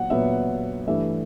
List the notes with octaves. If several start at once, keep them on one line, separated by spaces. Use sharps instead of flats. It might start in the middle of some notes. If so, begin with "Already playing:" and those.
Already playing: A#2 F#3 B3 F#5
A#2 F#3 B3 E5
G2 E3 A3 E5